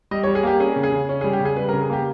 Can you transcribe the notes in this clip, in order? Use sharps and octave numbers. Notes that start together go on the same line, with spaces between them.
G3 D#5
C#5
G3
G#4
A#3 G4
C#4 G#4
C#3
G#4
C#3
C#4
G3 G#4
G4
C#3
G#4
G3 B4
A#4
C#3
G#4
A#3 G4